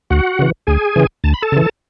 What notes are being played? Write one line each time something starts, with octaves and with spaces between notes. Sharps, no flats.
D2 F#4 F#5
C#3 E3
D2 G#4 G#5
C#3 E3
D2 A5
B5
A4 A5
C#3 E3